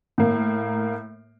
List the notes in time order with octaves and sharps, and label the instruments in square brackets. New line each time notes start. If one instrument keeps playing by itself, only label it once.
[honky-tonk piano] A2 A#3